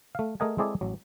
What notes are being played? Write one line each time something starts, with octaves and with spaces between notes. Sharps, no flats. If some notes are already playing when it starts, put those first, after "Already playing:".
A3 F5
A3 G#4 A#4 D#5 F#5 G#5
G#3 C4 E4 G#4 A4 D5
A1 F#3